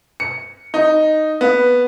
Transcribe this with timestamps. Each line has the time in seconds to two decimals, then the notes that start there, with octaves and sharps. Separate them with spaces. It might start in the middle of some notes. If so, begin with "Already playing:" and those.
0.20 C#7
0.74 D#4
1.41 B3